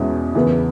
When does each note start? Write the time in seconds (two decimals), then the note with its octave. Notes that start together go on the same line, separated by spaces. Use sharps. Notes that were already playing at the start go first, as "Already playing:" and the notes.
Already playing: E2 B2 G#3 C#4 E4
0.35 E2 C#3 E3 B3